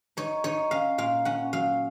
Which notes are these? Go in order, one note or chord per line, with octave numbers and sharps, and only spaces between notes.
D#4 C#5
D#4 C#5
C#4 F5
A#2 F5
C#4 F#5
F#3 F5